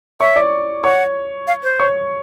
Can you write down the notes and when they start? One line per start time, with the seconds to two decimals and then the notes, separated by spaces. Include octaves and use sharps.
0.20 C#5 E5 C#6
0.36 D5 D6
0.84 C#5 F#5 C#6
1.47 F5
1.63 C5
1.79 C#5 C#6